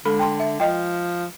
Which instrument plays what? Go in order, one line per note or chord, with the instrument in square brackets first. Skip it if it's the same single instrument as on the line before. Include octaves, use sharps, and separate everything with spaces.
[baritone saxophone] D3 [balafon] G#3 A4 B5
[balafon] G5 A5 C6
E5
[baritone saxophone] F3 [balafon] D#5 G5